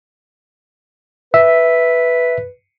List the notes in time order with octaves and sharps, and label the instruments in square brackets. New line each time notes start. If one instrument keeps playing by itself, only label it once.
[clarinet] B4 [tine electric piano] E5